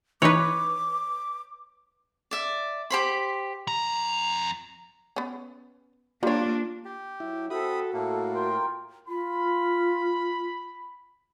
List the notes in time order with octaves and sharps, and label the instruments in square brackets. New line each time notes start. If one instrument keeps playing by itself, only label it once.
[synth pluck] E3 D#4 [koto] B4 C#5 [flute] D6
[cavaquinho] D5 E5
G4 C5 B5
[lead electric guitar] F2 A#5
[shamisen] B3 C#4
[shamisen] G3 C#5 [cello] A#3 D4 [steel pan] F4
[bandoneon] G4
[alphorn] F#3 [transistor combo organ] E4
[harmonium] C4 E5 [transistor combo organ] F#4 [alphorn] A4 [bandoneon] B5 D#6
[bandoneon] A2 A#3 [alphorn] A3 [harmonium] A4
[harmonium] F4 A#4 G5
[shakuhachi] F4 [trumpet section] B5